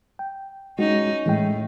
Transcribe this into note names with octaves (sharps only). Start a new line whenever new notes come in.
G5
G#3 C#4 D#4 F#4
A2 E3 G#3 G5